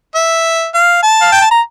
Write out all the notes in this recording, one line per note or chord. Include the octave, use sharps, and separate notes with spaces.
E5
F5
A5
F5
G5
A5
A#5